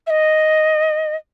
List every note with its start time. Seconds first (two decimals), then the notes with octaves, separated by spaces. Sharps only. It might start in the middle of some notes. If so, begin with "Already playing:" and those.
0.07 E5
0.10 D#5